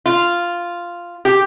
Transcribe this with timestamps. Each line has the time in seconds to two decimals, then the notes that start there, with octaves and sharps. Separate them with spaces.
0.06 F4
1.25 G4